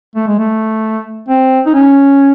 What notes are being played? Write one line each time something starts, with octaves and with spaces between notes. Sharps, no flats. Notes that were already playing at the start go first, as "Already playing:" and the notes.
A3
G#3
A3
C4
D#4
C#4